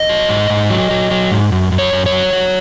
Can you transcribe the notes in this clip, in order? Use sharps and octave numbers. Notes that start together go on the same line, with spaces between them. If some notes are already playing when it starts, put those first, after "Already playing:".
Already playing: D#5
F#3
G#2
G#2
F#3
F#3
F#3
G#2
F#2
F#2
C#5
F#2
C#5
F#3
F#3